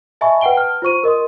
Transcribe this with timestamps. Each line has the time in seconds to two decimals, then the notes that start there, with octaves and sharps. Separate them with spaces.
0.21 D#5 E5 G#5 A5 B5 C#6
0.41 B4 F#5 G5 D7 G7
0.56 A5 F6
0.82 F4 C5 C#6 D#7
1.04 A#4 D#5 C6 D#6